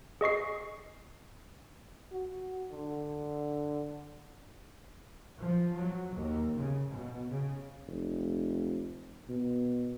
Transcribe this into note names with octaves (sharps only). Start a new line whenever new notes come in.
G#4 D#5 C#6 C7
F#4
D3
F3
F#3
D#2
C#3
B2
C#3
F1
B2